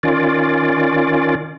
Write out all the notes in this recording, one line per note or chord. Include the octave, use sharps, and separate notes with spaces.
D#3 C#4 F4 D5